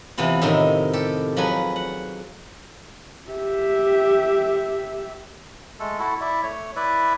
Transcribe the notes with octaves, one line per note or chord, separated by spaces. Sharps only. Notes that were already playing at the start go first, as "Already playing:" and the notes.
C3 E3 B3 F4
A2 C3 D#3 D#4
G4 A4
F3 F#3 G#4 B4
F#5
G4 E5
G#3 A3 A4
E4 F#4 A4
E4 D5 E5
A3 C#5
E4 B4 D5 E5